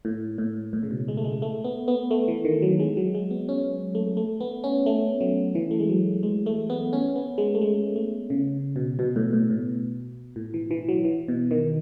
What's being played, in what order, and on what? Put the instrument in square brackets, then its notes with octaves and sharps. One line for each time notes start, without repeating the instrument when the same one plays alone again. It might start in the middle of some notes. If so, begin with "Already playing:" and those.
[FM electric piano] A2
A2
A2
C#3
B2
G#3
A3
G#3
A3
B3
B3
A3
E3
D#3
F#3
G#3
F#3
G#3
B3
C#4
A3
A3
B3
C#4
A3
F#3
E3
A3
G#3
F#3
G#3
A3
B3
C#4
B3
G#3
A3
G#3
A3
C#3
B2
B2
A2
A2
B2
A2
E3
E3
F#3
E3
B2
D#3